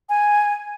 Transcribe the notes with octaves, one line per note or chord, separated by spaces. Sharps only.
G#5